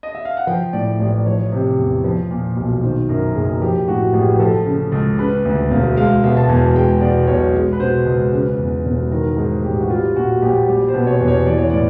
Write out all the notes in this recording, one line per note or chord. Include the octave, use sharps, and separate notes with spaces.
D#5
E5
F5
F#5
F3 G5
A2 D5
A1 D5
D5
F3 C#5
C3
E2
F3
A#2
B1
D#3 C5
F#2 A#4
F#1 G#4
F3 G4
A2 F#4
A1 G4
G#4
G4
F3 A4
C#3
C#2
C#3 B4
D2
E1 F5
G#3 F5
B2 E5
A5
E2 G#5
G#3 G5
B2 D5
B1 C#5
G#3
B4
B2 C5
C#2 B4
C#3
E2
E1
D#3 A#4
G#2 G#4
A1 G4
F#4
G3 F4
A#2 F#4
A#1 G4
G3 G4
C5
B2
C#5
E2
C#5
E3 D5
C#5
A2 D5